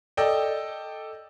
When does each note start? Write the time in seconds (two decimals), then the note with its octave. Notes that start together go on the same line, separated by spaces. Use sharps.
0.17 A4 D5 D#5 G5